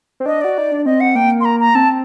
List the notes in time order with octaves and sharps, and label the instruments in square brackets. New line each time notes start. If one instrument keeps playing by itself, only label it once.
[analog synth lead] C4
[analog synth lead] D4 [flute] D#5
[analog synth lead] F#4 [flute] D5
[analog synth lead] D#4
D4
[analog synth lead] C4 [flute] D#5
[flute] F#5
[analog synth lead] A#3 [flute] G5
[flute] C6
A#5
A#5
[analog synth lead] C4 [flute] A5